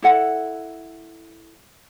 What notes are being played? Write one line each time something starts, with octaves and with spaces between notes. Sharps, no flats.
E4 A4 F#5